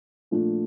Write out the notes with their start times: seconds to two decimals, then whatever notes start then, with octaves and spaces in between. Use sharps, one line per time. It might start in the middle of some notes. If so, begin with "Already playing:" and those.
0.31 A#2 F3 A3 D4